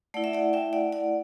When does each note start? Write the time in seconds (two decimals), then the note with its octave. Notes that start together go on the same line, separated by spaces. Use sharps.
0.14 A3 E4 D5 F#5
0.24 E5
0.33 D5 F#5
0.53 E5 G5
0.73 D5 F#5
0.93 D5 F#5